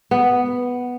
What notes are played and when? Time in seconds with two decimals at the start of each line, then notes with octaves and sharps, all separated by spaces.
0.11 B3